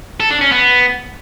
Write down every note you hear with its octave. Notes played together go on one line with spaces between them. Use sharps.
A4
D4
C#4
B3